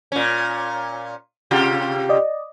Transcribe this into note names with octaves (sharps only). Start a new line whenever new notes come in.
A#2 C#4
C3 F4 G4
D5 D#5